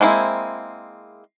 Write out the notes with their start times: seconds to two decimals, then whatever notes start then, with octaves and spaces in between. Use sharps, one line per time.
0.01 G#3 A#3 C4 E4